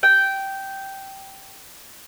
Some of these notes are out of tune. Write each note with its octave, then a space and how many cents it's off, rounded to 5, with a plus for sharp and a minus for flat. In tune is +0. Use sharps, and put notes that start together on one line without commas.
G5 -10